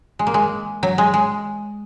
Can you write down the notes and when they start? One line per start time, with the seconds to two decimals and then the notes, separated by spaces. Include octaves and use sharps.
0.19 G#3
0.27 A#3
0.34 G#3
0.83 F#3
0.98 G#3
1.14 G#3